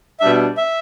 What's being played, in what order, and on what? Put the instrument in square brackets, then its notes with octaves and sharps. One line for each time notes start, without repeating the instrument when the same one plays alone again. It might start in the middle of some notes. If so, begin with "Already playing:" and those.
[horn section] B2 G3 D4 [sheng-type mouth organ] E5
[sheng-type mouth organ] E5